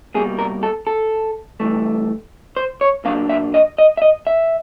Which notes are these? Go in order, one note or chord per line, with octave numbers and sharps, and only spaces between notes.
C2 B2 G3 A#3 G#4
A#4
A4
A4
G2 E3 A3
C5
C#5
A#2 F#3 A#3 D4 F5
E5
D#5
D#5
E5
D#5
E5